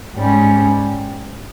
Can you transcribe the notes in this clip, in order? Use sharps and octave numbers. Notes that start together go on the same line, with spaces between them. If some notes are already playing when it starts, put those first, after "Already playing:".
G#2 G3 C#4